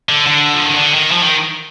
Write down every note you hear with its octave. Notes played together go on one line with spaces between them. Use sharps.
D3
D3
F3
D#3
D3
D#3
F3
D#3